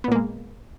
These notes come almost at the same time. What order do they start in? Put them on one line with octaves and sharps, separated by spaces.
B3 A#2 A#3 G#3